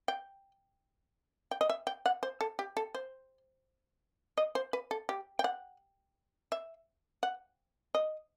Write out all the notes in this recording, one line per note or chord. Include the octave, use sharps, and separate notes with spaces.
G5
G5
D#5
E5
G5
F#5
C5
A4
G4
A4
C5
D#5
C5
B4
A4
G4
G5
F#5
E5
F#5
D#5